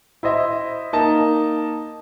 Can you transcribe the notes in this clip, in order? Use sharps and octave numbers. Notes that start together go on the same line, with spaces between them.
E4 C5 D#5 E5
A#3 D#4 A5